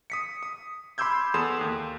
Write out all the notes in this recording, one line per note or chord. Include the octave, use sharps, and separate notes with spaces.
D#6 B6 C#7
D#6
B5 C6 D6 E6 G6 G#6
E2 A4 C6 D#6 E7
D#2